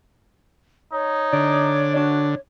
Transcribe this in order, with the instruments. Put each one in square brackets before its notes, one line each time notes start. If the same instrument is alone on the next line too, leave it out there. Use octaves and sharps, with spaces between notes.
[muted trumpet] D#4 [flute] C#5
[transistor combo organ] D3 [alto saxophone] D5
[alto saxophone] D4 [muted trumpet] F#4